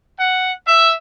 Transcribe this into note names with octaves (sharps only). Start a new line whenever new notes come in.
F#5
E5